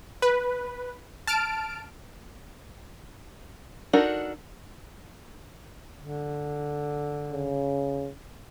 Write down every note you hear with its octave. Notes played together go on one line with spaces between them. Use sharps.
B4
A5 F6 D7
D4 D#4 F#4 A4 A#4
D3
C#3